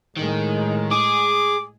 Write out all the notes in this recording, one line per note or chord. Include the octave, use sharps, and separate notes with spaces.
A2 D#3 G#3
G#4 D6